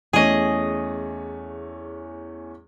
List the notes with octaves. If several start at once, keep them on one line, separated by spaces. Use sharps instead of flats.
E2 A3 C#4 G#4 D#5